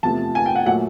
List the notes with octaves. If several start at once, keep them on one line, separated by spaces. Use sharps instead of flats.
E2 C3 F3 A3 A5
G#5
G5
F#5
A#2 F#3 A3 F#5